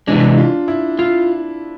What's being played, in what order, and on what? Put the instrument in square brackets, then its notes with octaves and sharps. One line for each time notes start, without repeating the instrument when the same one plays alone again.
[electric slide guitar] C3 E3 G#3 [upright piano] D4
[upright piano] F4
E4
[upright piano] E4 [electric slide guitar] F4